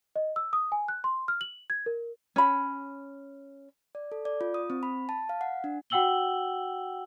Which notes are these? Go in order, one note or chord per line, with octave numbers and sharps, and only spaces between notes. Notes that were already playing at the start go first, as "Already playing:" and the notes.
D#5
E6
D#6
G#5
F#6
C6
F6
F#7
G#6
A#4
C#4 B5
D5
A4
D5
F4
D#6
C4
B5
A5
F5
F#5
D4
F#4 F#5 G5 E6 F#7 G7